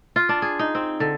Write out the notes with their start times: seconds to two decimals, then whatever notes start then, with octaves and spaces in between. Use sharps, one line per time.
0.16 F4
0.29 D4
0.42 G#4
0.59 D#4
0.75 C4
1.00 D3